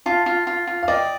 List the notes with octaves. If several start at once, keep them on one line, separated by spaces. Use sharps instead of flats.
F4 F5 A5
F4
F4
F4
F5
D5 D#5 G5